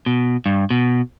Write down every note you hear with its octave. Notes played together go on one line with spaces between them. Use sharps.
B2
G2
B2